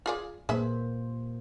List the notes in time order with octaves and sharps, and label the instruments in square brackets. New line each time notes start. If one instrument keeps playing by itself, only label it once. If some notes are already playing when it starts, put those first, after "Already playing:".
[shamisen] F4 G#4 D5
[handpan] A#2 A#3 C5 [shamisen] G#4 B4 E5